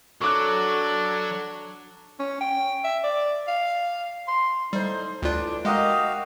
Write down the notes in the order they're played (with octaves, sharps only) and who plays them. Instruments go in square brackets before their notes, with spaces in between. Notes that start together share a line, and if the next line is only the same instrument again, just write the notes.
[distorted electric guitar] F#3 [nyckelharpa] D4 [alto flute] A4 [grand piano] C#6 D6 F#6
[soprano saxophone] C#4
G5
E5
D5
F5
C6
[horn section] A2 D#4 C5 [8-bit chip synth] G3
[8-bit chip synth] D2 F4 [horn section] A2 E3 D4
[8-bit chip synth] G#3 [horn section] D#4 A#4 D#5 [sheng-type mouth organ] F#4 G4 F5